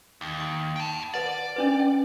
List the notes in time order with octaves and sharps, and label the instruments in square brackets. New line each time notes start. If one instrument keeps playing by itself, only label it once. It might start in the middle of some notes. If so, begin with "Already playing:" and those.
[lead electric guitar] D#2
[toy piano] D6
[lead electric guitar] G5 A5
[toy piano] B4 F#5 [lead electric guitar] D5
[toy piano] C#4 D4 B4
G5